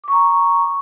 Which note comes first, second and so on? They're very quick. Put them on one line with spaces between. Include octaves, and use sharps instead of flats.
D6 C#6 A#5